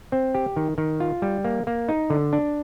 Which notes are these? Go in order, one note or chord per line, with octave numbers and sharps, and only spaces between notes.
C4
G4
D#3
D#3
F4
G3
A#3
A#3
D#4
D3
D4